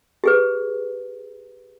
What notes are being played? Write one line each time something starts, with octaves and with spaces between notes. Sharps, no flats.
G4 G#4 B4